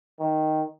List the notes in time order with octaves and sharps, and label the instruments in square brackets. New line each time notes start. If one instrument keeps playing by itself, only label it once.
[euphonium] D#3